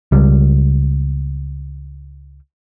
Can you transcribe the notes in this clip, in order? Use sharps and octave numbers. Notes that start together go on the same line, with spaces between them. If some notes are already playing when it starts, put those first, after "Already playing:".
C#2 G3